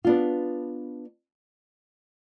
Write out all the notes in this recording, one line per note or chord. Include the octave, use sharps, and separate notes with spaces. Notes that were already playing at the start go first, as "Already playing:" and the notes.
B3 D4 F4